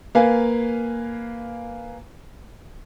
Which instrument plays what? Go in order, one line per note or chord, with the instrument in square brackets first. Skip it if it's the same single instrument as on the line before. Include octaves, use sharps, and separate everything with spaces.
[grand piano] A#3 B4 F5 G#5